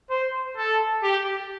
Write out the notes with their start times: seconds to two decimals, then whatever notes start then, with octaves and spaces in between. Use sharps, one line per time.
0.10 C5
0.57 A4
1.03 G4